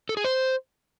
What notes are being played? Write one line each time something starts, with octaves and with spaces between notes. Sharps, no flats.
A4
G#4
C5